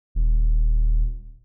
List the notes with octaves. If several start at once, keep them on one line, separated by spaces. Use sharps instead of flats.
D#1